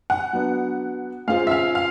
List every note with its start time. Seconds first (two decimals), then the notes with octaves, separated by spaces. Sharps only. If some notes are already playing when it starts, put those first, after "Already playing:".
0.10 F#5
0.33 F#3 B3 D4
1.27 G#3 C#4 F4 G#4 C5 F5
1.47 E5
1.51 F5
1.75 F5